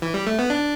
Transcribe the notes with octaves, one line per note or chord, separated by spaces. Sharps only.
E3
G3
A3
B3
D4